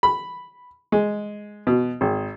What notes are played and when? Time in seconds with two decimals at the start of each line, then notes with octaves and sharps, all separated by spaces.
0.03 B5
0.92 G#3
1.67 B2
2.01 G#1